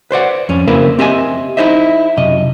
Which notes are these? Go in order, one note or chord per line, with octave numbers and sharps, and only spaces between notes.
B4 C5 D5 F#5
F2 C#4
C#3 A#3 C4 E4 A#4 B4
C4 G4 D#5 E5 G#5
D#4 E4 G4 C5 D#5 E5
F#2 C3 D#5